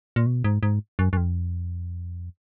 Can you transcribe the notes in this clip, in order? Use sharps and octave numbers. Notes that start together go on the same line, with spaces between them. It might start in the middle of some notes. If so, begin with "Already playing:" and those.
A#2
B2
G#2
G#2
F#2
F#2
F2